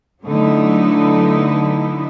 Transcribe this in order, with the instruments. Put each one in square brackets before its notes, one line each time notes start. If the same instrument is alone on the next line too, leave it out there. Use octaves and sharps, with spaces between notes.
[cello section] D3 F#3 A3 B3 D#4 E4